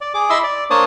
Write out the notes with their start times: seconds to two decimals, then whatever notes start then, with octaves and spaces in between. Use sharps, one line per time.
0.01 D5
0.14 G#4 D6
0.30 E4 D#5 E5 C6 E6
0.44 D5
0.71 A#3 D4 C5 C#5 A5 D#6